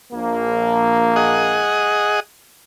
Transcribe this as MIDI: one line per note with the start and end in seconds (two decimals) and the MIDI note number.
0.13 1.67 34
0.13 1.67 58
1.16 2.20 68
1.16 2.20 75
1.16 2.20 78